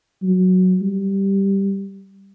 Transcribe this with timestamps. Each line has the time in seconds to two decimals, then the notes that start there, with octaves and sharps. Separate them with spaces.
0.23 F#3
0.82 G3